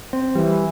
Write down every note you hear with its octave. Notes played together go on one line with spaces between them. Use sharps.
C4
E3 G3